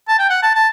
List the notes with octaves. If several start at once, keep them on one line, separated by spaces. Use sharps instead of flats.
A5
G5
F#5
A5
A5